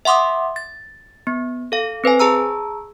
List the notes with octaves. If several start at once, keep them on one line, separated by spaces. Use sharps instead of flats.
E5 F#5 C6 D6 D#6
A6
B3
A4 F5
C4 B4 C5 G#5
G#4 A5 A#5 E6